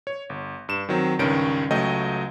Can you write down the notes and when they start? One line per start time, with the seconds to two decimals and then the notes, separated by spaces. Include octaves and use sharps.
0.07 C#5
0.30 G1
0.69 G2 E7
0.89 D#3 F#3 C4
1.19 C#2 G2 D#3 C#4 D7
1.71 C#2 F#3 A3 D#5 G5